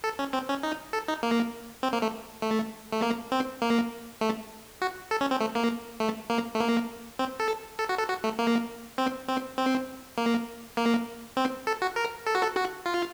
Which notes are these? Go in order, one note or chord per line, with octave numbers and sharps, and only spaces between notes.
A4
C#4
C4
C#4
D#4
A4
D#4
A#3
C4
A#3
A3
A3
A3
A#3
C4
A#3
A3
F#4
A4
C#4
C4
A3
A#3
A3
A#3
A3
A#3
C4
A4
A4
F#4
A4
F#4
A3
A#3
C4
C4
C4
A#3
A#3
C4
A4
F#4
A#4
A4
F#4
A4
F#4
F4